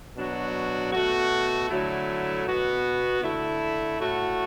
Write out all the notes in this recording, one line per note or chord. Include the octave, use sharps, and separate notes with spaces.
B2 F#3 D4 F#4
B2 A3 F#4
D3 F#3 A3 E4
B2 B3 F#4
D3 A3 E4
A2 A3 F#4